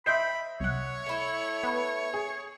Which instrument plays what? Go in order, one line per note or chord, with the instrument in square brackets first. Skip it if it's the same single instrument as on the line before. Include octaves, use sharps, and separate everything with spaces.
[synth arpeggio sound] C5 G5 C6 [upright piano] D#5 E5 [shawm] B5
[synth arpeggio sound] C2 F#5 [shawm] C#5
[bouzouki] A3 E4
[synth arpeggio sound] B3
[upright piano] G#4